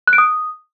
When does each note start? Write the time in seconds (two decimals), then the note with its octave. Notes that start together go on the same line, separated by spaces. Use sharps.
0.07 F#6
0.13 D7
0.18 D#6